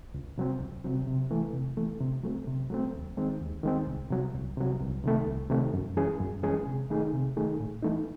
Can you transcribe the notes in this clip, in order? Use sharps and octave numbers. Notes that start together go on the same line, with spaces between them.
C#2
C3 F#3 C4
C#2
C3 F#3 C4
C3
E3 A3
C3
E3 A3
C3
F#3 A3 C4
C3
F#3 A3 C4
D#2
D#3 G#3 C4
D#2
D#3 G#3 C4
C2
C3 F#3
C2
C3 F#3
C2
C3 D#3 A3
C2
C3 D#3 A3
F#2
E3 G#3 C#4 G#4
F#2
E3 G#3 C#4 G#4
C3
D#3 A3 D#4 G#4
C3
D#3 A3 D#4 G#4
A2
E3 A3 D#4